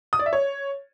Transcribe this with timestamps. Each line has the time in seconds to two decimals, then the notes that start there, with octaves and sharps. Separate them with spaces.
0.13 D#6
0.19 D5
0.26 E5
0.33 C#5